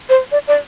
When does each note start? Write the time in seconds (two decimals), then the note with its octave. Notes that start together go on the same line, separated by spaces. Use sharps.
0.09 C5
0.32 D5
0.48 D5